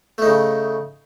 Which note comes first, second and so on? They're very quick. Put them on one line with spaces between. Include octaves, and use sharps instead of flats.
A3 D#4 C#3